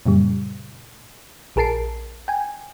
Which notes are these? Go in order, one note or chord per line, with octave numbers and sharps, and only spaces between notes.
F#2 A#2 C#3 G3
A#1 G#4 A#4 A5 C7 D7
G5 G#5